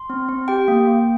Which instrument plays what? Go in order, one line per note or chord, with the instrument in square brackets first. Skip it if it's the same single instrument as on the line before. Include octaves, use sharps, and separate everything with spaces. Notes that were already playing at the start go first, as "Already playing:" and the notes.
Already playing: [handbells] C6
C4
C4
G4 G5
A#3
A#3